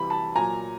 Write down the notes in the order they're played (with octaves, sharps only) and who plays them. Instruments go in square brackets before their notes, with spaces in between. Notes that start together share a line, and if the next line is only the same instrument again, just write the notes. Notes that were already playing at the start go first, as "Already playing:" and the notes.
Already playing: [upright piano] C3 E3 G3 B5
A5 B5
A#2 F#3 G#5 A#5